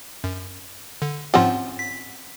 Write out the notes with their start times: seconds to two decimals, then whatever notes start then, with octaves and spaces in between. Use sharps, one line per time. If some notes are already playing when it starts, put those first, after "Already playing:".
0.24 F#2
1.02 D3
1.34 G#2 F3 C4 C#4 F4 F#5
1.79 B6